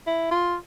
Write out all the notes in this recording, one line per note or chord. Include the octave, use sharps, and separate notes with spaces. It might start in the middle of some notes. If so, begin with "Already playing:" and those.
E4
F4